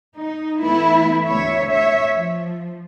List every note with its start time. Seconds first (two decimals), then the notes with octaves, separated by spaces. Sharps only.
0.14 D#4
0.61 E3 A3 B3 E4
1.24 D2 C#5 E5
1.67 C#5 E5
2.14 F3